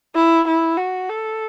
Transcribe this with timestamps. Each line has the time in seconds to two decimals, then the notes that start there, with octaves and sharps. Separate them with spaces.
0.15 E4
0.48 E4
0.78 F#4
1.10 A4